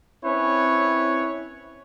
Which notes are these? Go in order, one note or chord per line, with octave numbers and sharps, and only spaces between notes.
C4 C#4 E4 B4 C#5